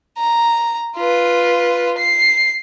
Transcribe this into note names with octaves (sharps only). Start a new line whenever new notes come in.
A#5
F4 B4
C7